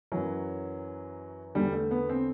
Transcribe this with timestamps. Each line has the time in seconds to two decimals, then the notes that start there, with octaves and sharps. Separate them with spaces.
0.12 F#2 E3 F#3
1.55 E2 D3 G3
1.73 A3
1.91 B3
2.09 C4